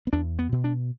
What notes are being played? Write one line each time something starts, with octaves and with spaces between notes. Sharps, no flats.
B3
E2 D4
B3
B2
D4